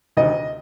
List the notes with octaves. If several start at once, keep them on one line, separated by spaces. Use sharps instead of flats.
D2 C3 D#3 D#5